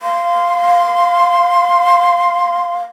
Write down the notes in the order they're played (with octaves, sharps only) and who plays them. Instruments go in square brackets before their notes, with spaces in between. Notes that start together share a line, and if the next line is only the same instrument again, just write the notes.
[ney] F5 [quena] C6